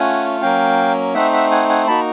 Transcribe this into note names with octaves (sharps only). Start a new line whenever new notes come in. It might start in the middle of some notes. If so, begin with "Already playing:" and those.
Already playing: A3 C#4 F4 F#5 G#5
F#3 A#3 C#4 F5 G5
A3 C4 D#4 E5 F#5
E5 F#5
F#5 G#5
F#5 G#5
A#3 D#4 F#4 A5 B5